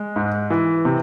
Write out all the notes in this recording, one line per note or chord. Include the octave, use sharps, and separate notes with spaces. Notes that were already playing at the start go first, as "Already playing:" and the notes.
Already playing: G#3
G#2
E3
C3